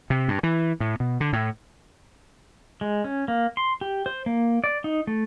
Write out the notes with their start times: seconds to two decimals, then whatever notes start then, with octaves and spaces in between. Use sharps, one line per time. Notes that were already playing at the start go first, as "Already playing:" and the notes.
0.10 C3
0.28 G2
0.43 E3
0.80 A2
1.00 B2
1.20 D3
1.33 A2
2.81 G#3
3.04 C#4
3.28 A#3
3.57 C6
3.81 G4
4.06 C5
4.26 A#3
4.64 D5
4.84 D#4
5.07 A3